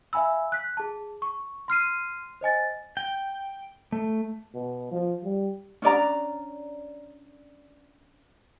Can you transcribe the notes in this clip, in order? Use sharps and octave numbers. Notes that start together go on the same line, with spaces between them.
E5 F5 G#5 B5 E6
F#6 B6
G#4 A5
C#6
C6 F6 C7 D#7
C5 D#5 G#5 A6
G5
A3
B2
F3
G3
C#4 D4 D5 A#5